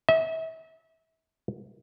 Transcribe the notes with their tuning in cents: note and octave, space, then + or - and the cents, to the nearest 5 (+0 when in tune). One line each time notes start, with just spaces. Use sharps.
E5 -35